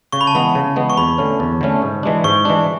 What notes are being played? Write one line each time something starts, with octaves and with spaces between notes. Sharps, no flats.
C#3 C#6
B5
A5
E3 G#3 B3 B5
C#3
E3 G#3 B3
C#6
E2 B5
D3 A3 C#4
E2
D3 A3 C#4
G#2
E3 G#3 D4
G#2 C#6
E3 G#3 D4